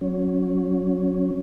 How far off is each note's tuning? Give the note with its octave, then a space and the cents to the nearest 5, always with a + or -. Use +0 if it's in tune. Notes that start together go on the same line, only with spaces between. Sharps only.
F#3 -15 C#4 +0